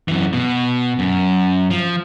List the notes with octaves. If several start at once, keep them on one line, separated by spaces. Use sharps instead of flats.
F#2 E3
B2
F#2
F3